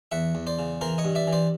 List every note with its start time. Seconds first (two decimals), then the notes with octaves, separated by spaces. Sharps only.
0.12 E2 E5 F#5
0.35 E2
0.47 C5 D5
0.59 C#3
0.81 E3 A#4 C5
0.98 C#5 D#5
1.04 G2
1.15 D5 E5
1.27 E3
1.33 C5 D5